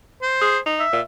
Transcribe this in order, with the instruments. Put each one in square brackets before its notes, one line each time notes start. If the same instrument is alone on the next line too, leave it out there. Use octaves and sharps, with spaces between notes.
[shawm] C5
[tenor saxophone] G#4
D#4
[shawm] E5
[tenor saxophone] A#2